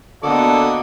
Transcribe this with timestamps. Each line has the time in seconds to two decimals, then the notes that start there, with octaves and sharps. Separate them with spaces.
0.23 D3 A#3 B3 F#4 A4 D5 D#5